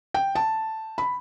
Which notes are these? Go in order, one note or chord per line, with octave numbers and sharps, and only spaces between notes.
G5
A5
B5